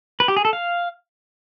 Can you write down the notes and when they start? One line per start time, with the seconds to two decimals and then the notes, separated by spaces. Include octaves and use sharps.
0.20 B4
0.28 G4
0.36 G#4
0.45 A4
0.53 F5